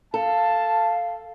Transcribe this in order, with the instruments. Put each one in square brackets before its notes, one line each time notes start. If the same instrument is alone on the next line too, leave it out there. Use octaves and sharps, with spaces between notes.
[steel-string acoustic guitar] A4 [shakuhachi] F5 [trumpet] A5